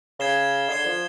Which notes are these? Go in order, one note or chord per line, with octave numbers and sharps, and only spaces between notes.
C#3 G#6 C7 E7 G7
D3 G#6 C7 E7 G7
F3